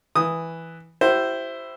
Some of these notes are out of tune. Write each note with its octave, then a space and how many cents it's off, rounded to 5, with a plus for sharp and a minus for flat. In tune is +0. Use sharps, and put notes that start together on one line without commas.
E3 +0 D#6 +0
E4 +10 G4 -35 C5 +0